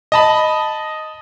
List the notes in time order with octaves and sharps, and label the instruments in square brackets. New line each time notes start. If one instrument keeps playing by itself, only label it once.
[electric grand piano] D#5 A5 B5